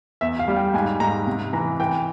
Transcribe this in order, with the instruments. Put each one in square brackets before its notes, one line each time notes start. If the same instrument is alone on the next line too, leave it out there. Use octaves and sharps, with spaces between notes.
[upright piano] E2 E5
F5
G3
G5
G#2 G#5
G#2 A#5
C3
E3 A#5
E3 G5